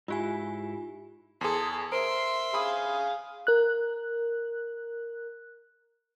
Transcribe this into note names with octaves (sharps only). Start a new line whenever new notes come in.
G#2 E4 F4 G4 G#5
E2 G#4 A4 C6 D#6
A#4 C5 E5 C6 D7
G#4 F5 B5 D#6
A#4 F#6